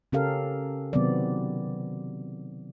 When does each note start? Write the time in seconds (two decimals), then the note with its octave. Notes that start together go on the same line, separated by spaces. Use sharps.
0.12 C#3 C#4 G4 A4 A#4 F5
0.93 C3 D#3 F#3 B3 C4 D5